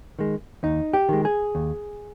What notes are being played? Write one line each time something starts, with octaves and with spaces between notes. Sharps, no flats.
D#3 G#3
D#2 D#4
G4
D#3 G#3
G#4
D#2